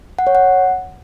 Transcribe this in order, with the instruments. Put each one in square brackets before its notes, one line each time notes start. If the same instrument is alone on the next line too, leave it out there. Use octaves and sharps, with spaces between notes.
[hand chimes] F#5
C#5
F#5